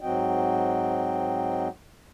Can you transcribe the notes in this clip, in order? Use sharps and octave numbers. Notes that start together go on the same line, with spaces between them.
G#2 F#3 C4 F#4 D#5 G5